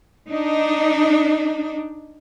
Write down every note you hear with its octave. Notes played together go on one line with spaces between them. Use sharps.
D4 D#4